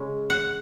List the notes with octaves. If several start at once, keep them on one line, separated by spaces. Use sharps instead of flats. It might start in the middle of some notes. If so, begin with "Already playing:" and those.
Already playing: C#3 G#3 C#4
F#5